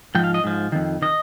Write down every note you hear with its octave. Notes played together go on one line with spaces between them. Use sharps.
G#2 F3 G5
F5
D#5
G#2 F3
F2 D#3
D#3 D#5